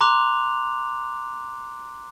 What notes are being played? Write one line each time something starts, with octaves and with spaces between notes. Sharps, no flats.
A#5 C6 D6 F#6 F7